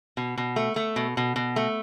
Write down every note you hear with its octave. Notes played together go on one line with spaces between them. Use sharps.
B2
B2
A3
A3
B2
B2
B2
A3